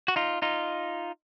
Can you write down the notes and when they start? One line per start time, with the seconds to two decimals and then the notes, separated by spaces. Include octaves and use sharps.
0.08 F#4
0.16 D#4 F4
0.42 D#4 F4